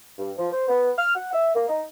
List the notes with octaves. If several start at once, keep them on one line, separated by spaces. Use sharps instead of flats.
G2
F3
C5
B3
F6
F#5
E5
A#3
D#4